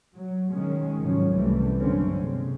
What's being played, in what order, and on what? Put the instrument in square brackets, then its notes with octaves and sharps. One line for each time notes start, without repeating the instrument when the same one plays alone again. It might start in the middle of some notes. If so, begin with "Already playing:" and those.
[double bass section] F#3
D#3 G#3 C#4
G#1 C#3 F3 F#3 C#4
C2 C3 E3 G3 A3
G1 D#2 D3 F#3 C4 C#4
C3 G#3